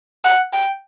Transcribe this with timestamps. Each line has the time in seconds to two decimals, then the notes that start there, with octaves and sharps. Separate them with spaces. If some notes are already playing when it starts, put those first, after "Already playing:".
0.24 F#5
0.53 G5